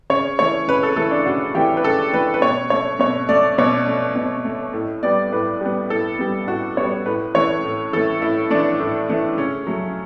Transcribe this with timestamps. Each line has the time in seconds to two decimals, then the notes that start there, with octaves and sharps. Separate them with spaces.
0.10 C#3 C#5
0.39 E3 A3 C#5
0.68 C#3 B4
0.83 A4
0.96 E3 A3 A4
1.11 D4
1.26 C#3 F#4
1.55 E3 A3 G4
1.77 B4
1.84 C#3 A4
2.13 E3 A3 B4
2.34 B4
2.42 B2 C#5
2.70 A3 C#5
2.99 B2 C#5
3.29 A3 D5
3.58 B2 C#5
3.87 A3
4.16 B2
4.45 A3
4.73 A2
5.03 G3 B3 D5
5.32 A2 B4
5.61 G3 B3
5.90 A2 A4
6.19 G3 B3
6.47 A2 F#4
6.77 G3 B3 C#5
7.06 A2 B4
7.34 E3 A3 C#5
7.64 A2
7.93 E3 A3 A4
8.22 A2 E4
8.50 E3 A3 D4
8.80 A2
9.09 E3 A3
9.37 C#3 C#4
9.67 F#3 A3